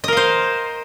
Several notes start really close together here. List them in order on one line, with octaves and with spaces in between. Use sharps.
D#5 A#4 F5 C5